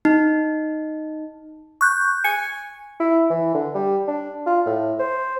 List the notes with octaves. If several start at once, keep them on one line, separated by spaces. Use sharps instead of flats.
D#4
C#6 F#6 G6
G#5 C#7
E4
E3
D3
G3
D4
F4
A2
C5